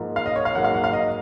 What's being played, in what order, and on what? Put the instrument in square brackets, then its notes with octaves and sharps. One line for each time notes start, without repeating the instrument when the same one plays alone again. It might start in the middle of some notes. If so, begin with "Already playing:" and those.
Already playing: [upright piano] G#2 F3 A#3
F5
D#5
C#5
F5
G#2 F#3 A#3 F#5
F5
F#5
F5
D#5